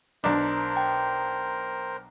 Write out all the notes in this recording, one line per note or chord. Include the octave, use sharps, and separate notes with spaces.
B1 D4 A#4 C5
G5